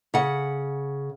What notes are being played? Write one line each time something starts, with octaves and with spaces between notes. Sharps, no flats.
C#3 F#5